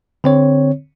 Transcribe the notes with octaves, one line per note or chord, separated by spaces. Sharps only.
D3 C4 C#5